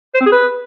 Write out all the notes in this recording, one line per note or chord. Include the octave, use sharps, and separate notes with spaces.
C5
C4
G#4
B4